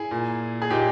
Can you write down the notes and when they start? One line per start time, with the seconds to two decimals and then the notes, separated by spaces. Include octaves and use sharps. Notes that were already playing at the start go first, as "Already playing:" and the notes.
Already playing: E4 G#4
0.11 A#2
0.62 G#4
0.70 A#2 D#4 G4